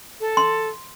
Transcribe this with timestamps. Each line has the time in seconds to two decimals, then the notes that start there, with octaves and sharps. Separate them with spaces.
0.20 A4
0.37 C6